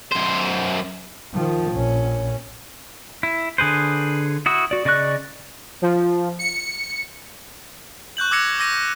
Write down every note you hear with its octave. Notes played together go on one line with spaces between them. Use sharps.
F#2 C5
D#3 F3
A#1 C#4
E4
D3 G#4 B4 C5
E4 F#4 D#6 E6
F#4 D5
C#3 D5 D#5 C#6 F#6
F3
C#7
C#6 F#6 G6 F#7
D6 E6 G#6 A#6 C#7
D6 E6 A#6 D#7